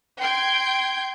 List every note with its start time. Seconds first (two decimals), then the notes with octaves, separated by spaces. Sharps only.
0.21 G5 C6 G6 G#6 D7